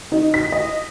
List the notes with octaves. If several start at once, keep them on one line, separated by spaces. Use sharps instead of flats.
D#4
B6
D#5